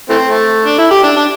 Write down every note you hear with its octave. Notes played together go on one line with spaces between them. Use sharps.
E3 A3 C4
A3
D4
E4
G4
D4
D4